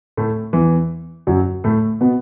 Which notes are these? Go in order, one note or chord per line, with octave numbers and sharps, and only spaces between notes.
A2 A3
E2 E3
F#2 F#3
A2 A3
B2 B3